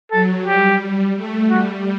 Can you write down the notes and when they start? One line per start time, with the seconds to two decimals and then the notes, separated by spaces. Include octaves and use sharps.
0.12 F#3 A4
0.46 G3 G4
1.16 A3
1.50 G3 F#4